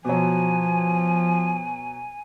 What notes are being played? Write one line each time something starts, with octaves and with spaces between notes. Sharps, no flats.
B2 F3 F#3 G#5